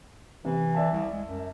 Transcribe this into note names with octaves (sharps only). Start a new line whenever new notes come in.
C3 E3
D5 E5 A5
C2
G#3
F#2